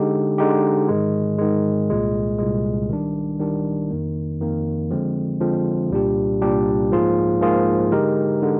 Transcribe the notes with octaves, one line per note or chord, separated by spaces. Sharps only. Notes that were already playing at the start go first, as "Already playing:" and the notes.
Already playing: D3 G#3 D#4 G4
D3 G#3 D#4 G4
G#2 D#3 G#3
G#2 D#3 G#3
C2 A#2 G#3
C2 A#2 G#3
D#3 G3 D4
D#3 G3 D4
F2 D#3 A#3
F2 D#3 A#3
D3 F3 G#3 C4
D3 F3 G#3 C4
C2 A#2 G3 D4 G4
C2 A#2 G3 D4 G4
G#2 F3 A#3 F4 G#4
G#2 F3 A#3 F4 G#4
D3 G#3 D#4 G4 A#4
D3 G#3